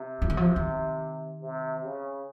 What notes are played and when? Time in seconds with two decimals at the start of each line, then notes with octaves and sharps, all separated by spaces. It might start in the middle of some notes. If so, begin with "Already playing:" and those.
Already playing: C3
0.22 F3
0.30 D#3
0.37 F3
0.56 D#3
1.41 C3
1.84 C#3